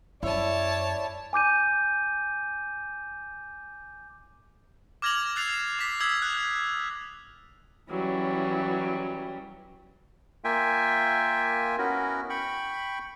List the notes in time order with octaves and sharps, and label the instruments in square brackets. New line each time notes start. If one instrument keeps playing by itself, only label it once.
[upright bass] F#2 [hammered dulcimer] E4 [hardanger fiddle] C#5 A5 [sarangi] D5
[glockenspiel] G#5 D6 G6 D#7
[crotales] D6 F6 G#6 A#6 F7 F#7
E6 F#6 A6 C7 F7
D6 B6
D#6 E6 G#6
F#6
[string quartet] E3 F#3 G3 C#4
[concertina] A#3 F4 E5 G5 G#5
B3 C#4 E4 F#4 A#4
G5 B5 C#6